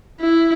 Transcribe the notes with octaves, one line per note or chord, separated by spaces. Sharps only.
E4